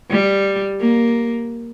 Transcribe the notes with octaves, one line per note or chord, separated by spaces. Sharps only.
G3
A#3